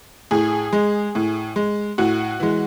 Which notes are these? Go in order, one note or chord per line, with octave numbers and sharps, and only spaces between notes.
A2 G#4
G#3
A2
G#3
A2 F#4
E3 G#3